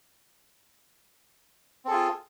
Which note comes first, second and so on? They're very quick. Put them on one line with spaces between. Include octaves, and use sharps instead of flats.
C4 A4 G#4 F4